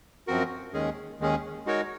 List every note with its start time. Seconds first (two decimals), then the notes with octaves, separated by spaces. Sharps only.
0.27 F#2 F3 C4 F#4 A#4
0.73 D#2 D#3 G#3 C#4 G#4
1.19 D#2 D#3 G#3 C#4 G#4
1.66 G#3 D#4 F#4 A#4 C#5